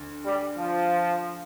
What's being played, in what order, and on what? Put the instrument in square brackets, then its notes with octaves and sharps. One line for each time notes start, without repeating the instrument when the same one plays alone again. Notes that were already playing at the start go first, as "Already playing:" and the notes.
Already playing: [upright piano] D2
[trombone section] G3
F3